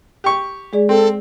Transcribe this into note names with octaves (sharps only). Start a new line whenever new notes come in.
G4 C#6
G#3 G#4 D5
C4 A4